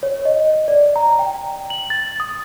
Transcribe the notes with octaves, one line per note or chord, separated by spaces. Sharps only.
C#5
D#5
D5
A#5
G5
F#7
A6
D#6